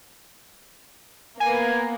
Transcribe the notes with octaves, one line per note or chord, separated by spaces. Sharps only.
A#3 B3 G#5